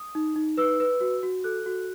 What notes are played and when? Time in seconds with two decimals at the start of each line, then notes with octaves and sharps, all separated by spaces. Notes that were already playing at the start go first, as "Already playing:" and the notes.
Already playing: D#6
0.15 D#4
0.36 D#4
0.57 B4 E6
0.80 B4
1.01 F#4
1.23 F#4
1.44 A4 F#6
1.66 F#4